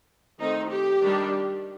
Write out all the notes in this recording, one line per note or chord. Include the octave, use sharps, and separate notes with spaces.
D#3 A3 C4 D#4
G4
D#3 G3 D4